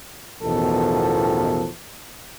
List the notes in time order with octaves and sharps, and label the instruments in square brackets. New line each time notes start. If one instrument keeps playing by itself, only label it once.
[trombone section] A1 E2 B2 D#3 F3 A4